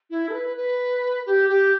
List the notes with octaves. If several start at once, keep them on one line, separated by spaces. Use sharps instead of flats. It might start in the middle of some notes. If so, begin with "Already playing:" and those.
E4
A4
B4
B4
G4
G4